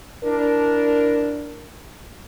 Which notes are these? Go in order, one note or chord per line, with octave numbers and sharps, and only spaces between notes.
D4 E4 A#4